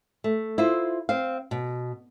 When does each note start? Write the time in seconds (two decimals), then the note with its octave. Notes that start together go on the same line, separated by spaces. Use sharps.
0.24 A3
0.58 E4 F4 C5
1.09 C4 F5
1.51 B2